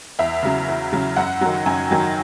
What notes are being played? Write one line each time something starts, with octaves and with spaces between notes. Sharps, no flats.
E2 E5
C#3 F#3
E2
C#3 F#3
F#2 F#5
D#3 F#3
F#2 G#5
D#3 F#3